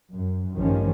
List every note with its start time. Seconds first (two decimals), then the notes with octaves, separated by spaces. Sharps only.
0.13 F#2
0.57 A1 G2 D#3 F3 G3 C#4